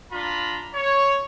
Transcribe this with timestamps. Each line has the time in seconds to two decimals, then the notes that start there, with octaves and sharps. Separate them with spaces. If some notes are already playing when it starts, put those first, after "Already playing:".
0.12 D4 F4 A#5 B5
0.74 C#5